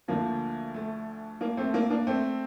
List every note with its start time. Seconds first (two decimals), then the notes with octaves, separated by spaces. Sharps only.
0.08 D2 D3 F3 A#3
0.74 A3
1.41 A#3
1.57 A3 C4
1.74 A#3
1.90 A#3 D4
2.07 A3 C4